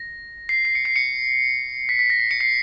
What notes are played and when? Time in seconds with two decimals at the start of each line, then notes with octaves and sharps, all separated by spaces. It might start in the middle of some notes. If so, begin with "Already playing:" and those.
Already playing: A#6
0.49 C7
0.65 C7
0.75 C#7
0.85 C7
0.96 C#7
1.89 B6
1.99 B6
2.10 A#6
2.20 C7
2.31 C#7
2.41 C7